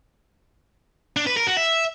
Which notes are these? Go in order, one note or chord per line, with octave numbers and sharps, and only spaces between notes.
D4
B4
A#4
F#4
E5